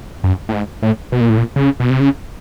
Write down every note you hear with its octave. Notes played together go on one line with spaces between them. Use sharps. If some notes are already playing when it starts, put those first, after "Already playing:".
F#2
A2
G#2
A2
B2
A#2
A2
A#2
C#3
B2
C3
C#3